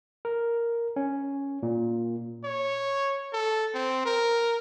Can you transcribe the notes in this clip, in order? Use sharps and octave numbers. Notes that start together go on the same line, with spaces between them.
A#4
C#4
A#2
C#5
A4
C4
A#4